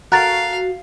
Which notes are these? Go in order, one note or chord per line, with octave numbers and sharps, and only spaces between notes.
F#4 A4 A#4 F5 A#5 F#6 A6